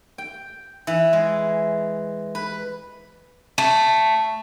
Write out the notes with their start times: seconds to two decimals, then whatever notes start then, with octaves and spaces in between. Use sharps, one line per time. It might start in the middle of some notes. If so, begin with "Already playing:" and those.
0.18 G5
0.87 E3
1.13 G#3
2.35 B4
3.58 A3